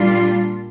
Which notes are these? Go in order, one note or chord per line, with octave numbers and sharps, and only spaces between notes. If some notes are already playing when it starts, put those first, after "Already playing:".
Already playing: A#2 G3 D4 F4